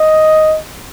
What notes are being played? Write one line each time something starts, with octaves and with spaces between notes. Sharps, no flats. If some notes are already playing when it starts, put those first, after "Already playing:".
Already playing: D#5